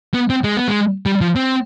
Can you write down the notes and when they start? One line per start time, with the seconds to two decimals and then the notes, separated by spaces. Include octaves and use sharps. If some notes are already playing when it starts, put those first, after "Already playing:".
0.14 B3
0.30 C4
0.44 G#3
0.57 B3
0.68 G#3
1.06 G3
1.21 F3
1.36 C4